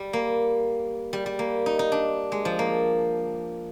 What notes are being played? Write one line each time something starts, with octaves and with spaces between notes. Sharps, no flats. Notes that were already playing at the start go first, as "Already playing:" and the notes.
Already playing: G3
A#3
G3
G3
A#3
D#4
D#4
D4
G#3
F3
A#3